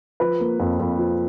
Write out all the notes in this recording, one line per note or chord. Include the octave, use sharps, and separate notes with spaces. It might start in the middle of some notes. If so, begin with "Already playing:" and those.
F3 B4
A#3
F2
F2
F3